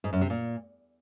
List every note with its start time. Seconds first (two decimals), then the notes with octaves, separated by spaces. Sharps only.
0.04 G#2
0.13 F#2
0.21 C3
0.30 A#2